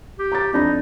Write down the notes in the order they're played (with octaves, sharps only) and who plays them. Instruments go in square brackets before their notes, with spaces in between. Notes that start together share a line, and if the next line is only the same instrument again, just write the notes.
[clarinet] G4
[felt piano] A#5 D6 A6
[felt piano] F2 D4 B5 [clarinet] D#4